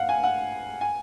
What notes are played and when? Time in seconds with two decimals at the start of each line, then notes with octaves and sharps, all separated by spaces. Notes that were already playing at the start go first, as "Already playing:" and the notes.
Already playing: F5 F#5
0.09 G#5
0.24 F#5
0.81 G#5